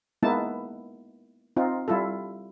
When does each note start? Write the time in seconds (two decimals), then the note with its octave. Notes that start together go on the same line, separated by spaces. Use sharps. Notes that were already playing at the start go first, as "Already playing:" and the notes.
0.23 G#3 A#3 B3 D#4 E4 A5
1.56 C4 D#4 F4
1.88 G3 E4 F4 A4